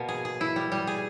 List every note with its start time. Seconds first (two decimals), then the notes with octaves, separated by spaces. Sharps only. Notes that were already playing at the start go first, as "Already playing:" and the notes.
Already playing: B2 A#3
0.09 G#4
0.25 G#4
0.41 E4
0.56 G3
0.72 G3
0.87 G#4